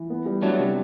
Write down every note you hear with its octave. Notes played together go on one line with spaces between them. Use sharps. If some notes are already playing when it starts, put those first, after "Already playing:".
Already playing: E3
B3
G3
F#3 A3 D4
C3